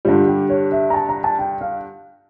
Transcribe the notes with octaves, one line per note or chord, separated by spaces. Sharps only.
G2 D3 G3 F4
G4
C#5
E5
A#5
A5
A#5
A5
G5
F5